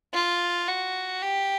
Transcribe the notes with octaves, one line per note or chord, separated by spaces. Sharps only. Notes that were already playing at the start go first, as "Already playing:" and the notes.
F4
F#4
G4